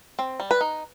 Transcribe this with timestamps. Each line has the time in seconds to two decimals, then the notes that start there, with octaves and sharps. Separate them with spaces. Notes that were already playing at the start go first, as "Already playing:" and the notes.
0.19 C4
0.40 G3
0.51 B4
0.61 D#4